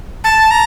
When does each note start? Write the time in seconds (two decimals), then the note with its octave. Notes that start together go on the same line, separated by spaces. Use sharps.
0.24 A5
0.51 A#5